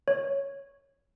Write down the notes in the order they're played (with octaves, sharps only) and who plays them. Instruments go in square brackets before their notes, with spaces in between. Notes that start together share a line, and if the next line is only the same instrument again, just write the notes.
[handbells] C#5